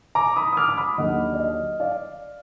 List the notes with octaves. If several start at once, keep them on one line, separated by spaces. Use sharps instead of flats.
A#5 D6
B5 D#6
D#6
D6 F6
D6
B5 D#6
D#2 D3 F#3 D#5 F#5
D5
D#5
D5 F5